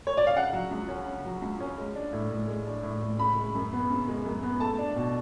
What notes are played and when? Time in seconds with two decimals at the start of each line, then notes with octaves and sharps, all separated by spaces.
0.07 C#5
0.17 D5
0.27 F5
0.36 C#3 F#5
0.53 F#3
0.71 C#2
0.88 C#4
1.06 C#3
1.25 F#3
1.42 C#2
1.60 C#4
1.78 G#3
1.95 D4
2.13 A2
2.31 A2
2.48 G#3
2.66 D4
2.83 A2
3.01 A2
3.18 C#3 B5
3.36 G#3
3.55 F#2
3.73 B3
3.90 C#3
4.08 G#3
4.25 F#2
4.43 B3
4.60 A3 A5
4.79 D4
4.96 B2